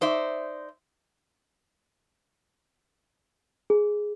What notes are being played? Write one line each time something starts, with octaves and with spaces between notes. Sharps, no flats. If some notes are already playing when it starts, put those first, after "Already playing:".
D#4 C5 D5 E5
G#4